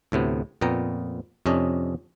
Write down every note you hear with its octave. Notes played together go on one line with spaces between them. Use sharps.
D2 A2 C3 B3
F2 A#2 B3 G5 A#5
F2 C3 C#4 D4 D#5